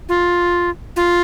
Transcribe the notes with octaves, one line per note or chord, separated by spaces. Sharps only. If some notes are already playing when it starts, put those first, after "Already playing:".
F4
F4